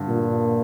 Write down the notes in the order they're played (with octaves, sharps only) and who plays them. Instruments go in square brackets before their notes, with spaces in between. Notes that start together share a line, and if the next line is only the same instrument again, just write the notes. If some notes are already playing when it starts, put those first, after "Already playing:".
Already playing: [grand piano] G2 D3
[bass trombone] A#2